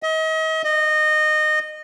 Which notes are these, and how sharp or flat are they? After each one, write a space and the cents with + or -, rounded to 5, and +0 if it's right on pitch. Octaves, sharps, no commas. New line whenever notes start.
D#5 +35
D#5 -25